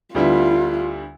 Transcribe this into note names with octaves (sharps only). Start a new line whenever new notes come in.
D2 D3 G3 B3 E4 F4